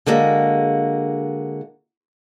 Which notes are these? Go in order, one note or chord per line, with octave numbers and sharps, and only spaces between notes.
D3 G#3 A#3 F#4